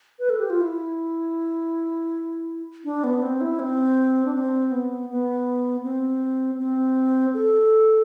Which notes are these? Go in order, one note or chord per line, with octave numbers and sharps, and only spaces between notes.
B4
A4
G4
F4
E4
D4
B3
C4
E4
C4
D4
C4
B3
B3
C4
C4
A4